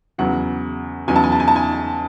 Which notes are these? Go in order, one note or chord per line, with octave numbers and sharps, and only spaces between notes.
E2 C#3 F#3 F#5
E2 C#3 F#3 G#5
A5
G#5
A5
G#5
A5
G#5